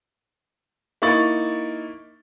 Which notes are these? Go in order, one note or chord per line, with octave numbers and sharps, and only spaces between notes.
A#3 D#4 E4 C#6 A6 F#7